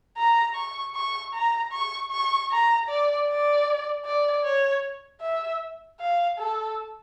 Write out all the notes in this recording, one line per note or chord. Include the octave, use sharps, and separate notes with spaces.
A#5
C#6
C#6
A#5
C#6
C#6
A#5
D5
D5
D5
C#5
E5
F5
A4